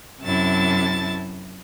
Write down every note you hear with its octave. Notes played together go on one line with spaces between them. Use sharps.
F#2 C3 E4 A5 A6